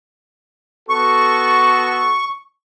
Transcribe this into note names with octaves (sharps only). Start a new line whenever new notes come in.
B3 F#4 A4 C#6